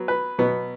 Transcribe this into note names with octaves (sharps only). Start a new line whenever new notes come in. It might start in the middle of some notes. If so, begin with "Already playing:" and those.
Already playing: F#3 B3
B4
B2 F#3 B3